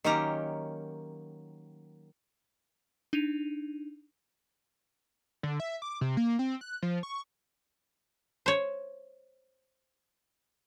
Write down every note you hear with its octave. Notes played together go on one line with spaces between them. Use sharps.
D#3 F#3 A#3 C#4 G4 A#5
D4 D#4 D#7 F7
D3
E5
D6
C3
A#3
C4
F#6
F3
C#6
C5 C#5